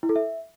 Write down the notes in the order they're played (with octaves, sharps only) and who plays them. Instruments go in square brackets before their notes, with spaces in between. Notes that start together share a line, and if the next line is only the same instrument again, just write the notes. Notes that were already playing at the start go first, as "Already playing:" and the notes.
[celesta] E4
A4
E5